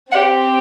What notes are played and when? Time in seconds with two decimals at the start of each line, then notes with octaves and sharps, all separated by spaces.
0.12 C4 G4 F#5